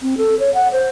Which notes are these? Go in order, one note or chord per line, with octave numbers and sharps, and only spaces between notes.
C4
A4
C#5
F#5
C5